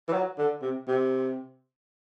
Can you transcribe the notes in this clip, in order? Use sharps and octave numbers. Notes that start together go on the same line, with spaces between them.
E3
F#3
D3
C3
C3